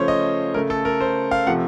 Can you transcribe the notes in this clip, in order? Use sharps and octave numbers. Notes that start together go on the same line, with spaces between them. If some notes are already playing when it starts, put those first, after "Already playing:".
Already playing: C#3 F3 A3 C5 C#5
D#5
C#3 A3 A#4
A4
A#4
C5
F5
C3 F3 A3 F#5